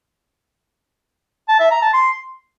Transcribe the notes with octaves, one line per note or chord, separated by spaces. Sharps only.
A5
E5
A#5
A5
C6